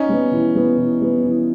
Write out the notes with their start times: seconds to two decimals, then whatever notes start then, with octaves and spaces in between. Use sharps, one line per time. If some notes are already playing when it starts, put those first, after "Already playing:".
Already playing: C#4 D#4
0.09 G3 B3
0.32 E3
0.55 G3 B3
0.77 E3
1.01 G3 B3
1.24 E3